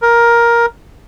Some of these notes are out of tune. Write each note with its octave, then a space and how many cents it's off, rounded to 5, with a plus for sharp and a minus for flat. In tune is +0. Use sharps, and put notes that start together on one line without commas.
A#4 +10